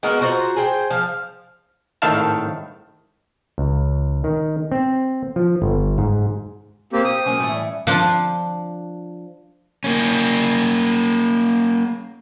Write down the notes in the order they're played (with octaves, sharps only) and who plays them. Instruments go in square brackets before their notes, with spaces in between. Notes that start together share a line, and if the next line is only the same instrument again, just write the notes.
[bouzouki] G#3 B3 F#4 A#4
F4 F#4 C5 A#5
G#4 C5 G5
F3 F5
[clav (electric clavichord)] G#1 A2 D#3 E5 F5 A5
C#2
D#3
C4
F3
G1
G#2
[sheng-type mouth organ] A#3 C4 G4 [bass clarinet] C5
[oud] G4 [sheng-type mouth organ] D#6
[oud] F#3 G#3 A#3 [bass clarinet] C#4
[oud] A2 E3
[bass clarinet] G3
[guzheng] F3 D4
[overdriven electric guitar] A#3 C#4